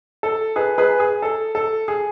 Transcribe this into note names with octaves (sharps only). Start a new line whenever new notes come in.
A4
G#4 B4
G#4 B4
G#4
A4
A4
G#4